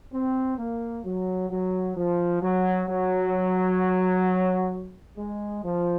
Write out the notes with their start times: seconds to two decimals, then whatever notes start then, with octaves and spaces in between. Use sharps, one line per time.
0.13 C4
0.58 A#3
1.05 F#3
1.50 F#3
1.96 F3
2.42 F#3
2.88 F#3
5.17 G#3
5.63 F3